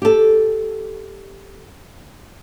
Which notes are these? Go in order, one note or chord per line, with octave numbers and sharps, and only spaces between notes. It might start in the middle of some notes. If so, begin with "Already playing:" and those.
G4 A4